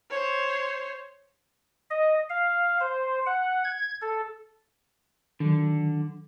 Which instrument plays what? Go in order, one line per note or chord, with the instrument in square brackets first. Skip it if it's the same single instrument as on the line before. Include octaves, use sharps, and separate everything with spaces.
[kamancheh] C5 C#5
[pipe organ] D#5
F5
C5
F#5
G#6
A4
[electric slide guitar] D3 [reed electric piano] D#3 F#3